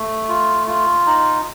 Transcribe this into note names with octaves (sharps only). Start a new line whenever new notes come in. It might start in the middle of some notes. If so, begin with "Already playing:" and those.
Already playing: A3
F4
F4
D#4